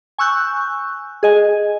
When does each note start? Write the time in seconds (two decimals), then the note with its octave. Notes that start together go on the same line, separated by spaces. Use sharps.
0.18 G#5 C#6 E6 F#6 G6
1.23 G#4 D#5 G#5